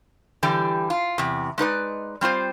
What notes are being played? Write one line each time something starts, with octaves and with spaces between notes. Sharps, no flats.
D3 E3 G3 G4
F4
E2 C3
G#3 D#4 B4 D5
G3 C4 F4 C5